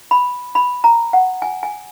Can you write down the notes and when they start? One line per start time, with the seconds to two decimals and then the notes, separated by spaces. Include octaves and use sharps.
0.11 B5
0.55 B5
0.84 A#5
1.13 F#5
1.42 G#5
1.63 G#5